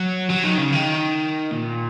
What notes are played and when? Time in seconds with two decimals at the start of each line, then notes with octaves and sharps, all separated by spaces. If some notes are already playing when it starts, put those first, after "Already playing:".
Already playing: F#3
0.30 F#3
0.44 D#3
0.58 C#3
0.72 D#3
1.51 A#2